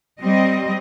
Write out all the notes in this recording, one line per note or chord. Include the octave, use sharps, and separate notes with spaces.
G3 C4 D#5